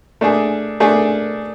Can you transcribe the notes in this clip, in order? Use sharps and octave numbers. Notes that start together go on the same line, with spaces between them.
A3 D4 G#4
A3 D4 G#4